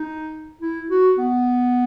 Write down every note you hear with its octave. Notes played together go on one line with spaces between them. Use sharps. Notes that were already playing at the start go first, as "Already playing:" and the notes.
Already playing: D#4
E4
F#4
B3